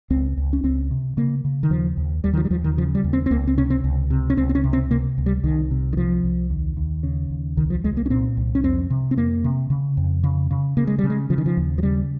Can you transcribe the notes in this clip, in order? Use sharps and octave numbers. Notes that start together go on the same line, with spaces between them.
C#2 C4
C#2
C#4
C#2 C4
C3
C#3 A#3
C#3
D#3
D#2 F3
D#2
D#2 G3
D#3
F3
G3
D#2 F3
D#3
C#3 F3
G3
D#2
C4
C4
C#2 A#3
C4
C3 C#4
C4
C#2
C3
C#4
C#2 C4
C4
C#4
C3
C4
C3 A#3
C#2
G3
C2 D#3
C3
D#3
C2 F3
C2
D#2
D#2
C#3
D#2
C2 D#3
F3
C2 G#3
A#3
C#4
A#2 C4
C2
C#4
F2 C4
C3
C4
F2 A#3
C3
C#3
F2
C#3
C#3
C#3 A#3
G#3
G3
C#3
G#3
C#3 F3
D#3
F3
D#2
F3
C#3 G3